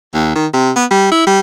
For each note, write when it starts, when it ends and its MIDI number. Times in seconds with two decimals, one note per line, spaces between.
0.14 0.32 39
0.36 0.46 51
0.54 0.71 48
0.76 0.85 59
0.91 1.11 55
1.12 1.27 64
1.27 1.40 55